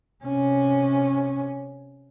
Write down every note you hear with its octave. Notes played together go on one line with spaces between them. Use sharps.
C3 C#4